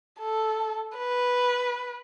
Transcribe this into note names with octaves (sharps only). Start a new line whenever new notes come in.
A4
B4